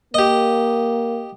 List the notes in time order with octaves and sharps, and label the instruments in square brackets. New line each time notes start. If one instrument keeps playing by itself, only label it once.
[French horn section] A#3 [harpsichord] G4 D#5